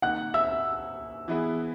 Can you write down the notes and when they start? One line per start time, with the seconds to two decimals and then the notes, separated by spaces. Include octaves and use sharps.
0.02 D#3 A#3 D#4 F#5 F#6
0.34 E5 E6
1.28 E3 B3 E4 G#4